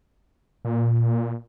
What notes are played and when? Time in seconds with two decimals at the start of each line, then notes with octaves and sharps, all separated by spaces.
0.65 A#2